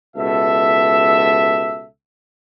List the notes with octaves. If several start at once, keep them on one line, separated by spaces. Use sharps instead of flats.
C#2 B2 A4 E5